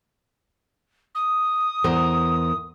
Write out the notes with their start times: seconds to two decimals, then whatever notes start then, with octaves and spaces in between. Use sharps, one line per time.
1.15 D#6
1.84 E2 A#4 C5